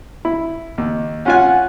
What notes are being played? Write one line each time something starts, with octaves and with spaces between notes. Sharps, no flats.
E4
D#2
C#4 F4 F#5 G#5